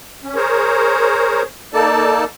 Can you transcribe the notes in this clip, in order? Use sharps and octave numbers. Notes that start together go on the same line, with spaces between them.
C#4
G#4 A#4 C5 C#5
A#3 D#4 A4 D5 A5